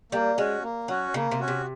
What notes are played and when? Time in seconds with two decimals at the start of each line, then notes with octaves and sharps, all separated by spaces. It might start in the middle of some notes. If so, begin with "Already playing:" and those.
0.12 G3 A#3
0.37 G#3 C#4 F#4
0.63 A#3
0.88 F#3 C#4 F#4
1.14 C#3 A#3
1.31 C3
1.40 C#4 F#4
1.48 C3